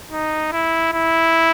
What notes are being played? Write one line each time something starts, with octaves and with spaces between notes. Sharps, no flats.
D#4
E4
E4